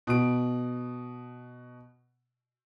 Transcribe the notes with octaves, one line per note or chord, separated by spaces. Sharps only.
B2 D7